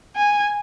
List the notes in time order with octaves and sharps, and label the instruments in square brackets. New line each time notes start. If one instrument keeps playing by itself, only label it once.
[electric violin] G#5